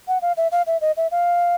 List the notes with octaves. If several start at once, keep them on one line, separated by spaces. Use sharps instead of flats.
F#5
F5
E5
F5
E5
D#5
E5
F5